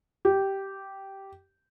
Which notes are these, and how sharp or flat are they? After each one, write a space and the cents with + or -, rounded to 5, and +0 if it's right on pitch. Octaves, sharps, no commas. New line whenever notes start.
G4 -10